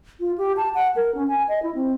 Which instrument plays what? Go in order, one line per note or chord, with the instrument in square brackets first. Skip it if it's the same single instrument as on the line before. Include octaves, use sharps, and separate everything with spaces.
[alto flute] F4
G4
A5
F#5
A#4
C#4
G#5
D#5
E4
C4